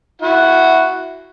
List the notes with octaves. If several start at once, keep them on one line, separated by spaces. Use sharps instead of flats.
E4 F#4 F#5